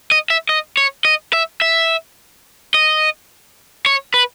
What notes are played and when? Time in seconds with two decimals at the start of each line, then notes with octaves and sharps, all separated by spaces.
0.12 D#5
0.30 E5
0.49 D#5
0.77 C#5
1.05 D#5
1.33 E5
1.62 E5
2.74 D#5
3.86 C#5
4.14 B4